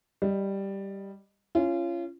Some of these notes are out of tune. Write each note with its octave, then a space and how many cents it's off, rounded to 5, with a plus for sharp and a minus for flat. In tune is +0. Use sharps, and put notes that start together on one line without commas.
G3 +0 D#5 -10
C#4 +0 F4 -30